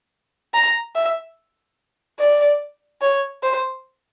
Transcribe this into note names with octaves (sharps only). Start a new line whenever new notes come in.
A#5
E5
D5
C#5
C5